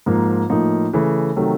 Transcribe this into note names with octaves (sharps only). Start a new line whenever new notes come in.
G#2 F3 A#3
A2 F3 A#3 D#4
C#3 E3 A3
C3 D#3 F#3 A3